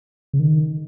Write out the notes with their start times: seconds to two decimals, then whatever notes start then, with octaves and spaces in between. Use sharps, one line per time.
0.33 C#3
0.40 D#3